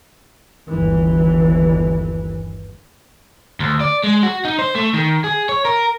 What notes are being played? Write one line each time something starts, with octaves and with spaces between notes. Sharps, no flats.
G1 D#2 E3
D2
D5
G#3
F#4
D#4
C5
A3
D#3
G#4
C#5
A#4